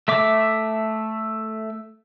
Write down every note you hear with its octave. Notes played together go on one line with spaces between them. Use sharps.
A3 E5 D6